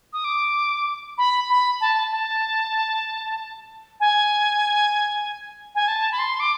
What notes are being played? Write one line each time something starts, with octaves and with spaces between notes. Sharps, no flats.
D#6
D6
B5
B5
A5
A5
G#5
G#5
A5
B5
C6
D6